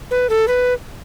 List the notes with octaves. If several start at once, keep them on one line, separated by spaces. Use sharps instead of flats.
B4
A4
B4